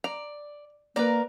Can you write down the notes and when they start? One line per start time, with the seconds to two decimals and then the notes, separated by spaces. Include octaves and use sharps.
0.04 D5 A#5
0.96 A#3 A#4 B4 D5 A#5